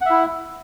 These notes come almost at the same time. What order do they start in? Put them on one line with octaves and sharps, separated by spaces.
F#5 E5 E4